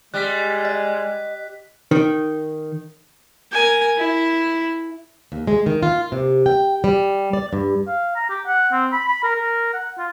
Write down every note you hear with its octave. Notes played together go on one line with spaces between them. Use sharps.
G3 G#3 F#6 B6
D#5
D#3
A#4 G#5
E4
D#2
G#3
D#3
F4
C3
G5
G3
D5
G2
F5
A#5
G4
F#5
C4
B5
B5
A#4
A#4
F#5
F4